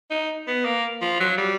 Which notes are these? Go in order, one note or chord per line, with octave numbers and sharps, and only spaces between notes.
D#4
B3
A#3
F3
F#3
G3